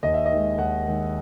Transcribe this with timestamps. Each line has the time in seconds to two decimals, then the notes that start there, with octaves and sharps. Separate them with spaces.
0.03 D#2 D#5
0.14 E5
0.26 D#5
0.31 D#3 G#3
0.58 D#2 F#5
0.86 D#3 G#3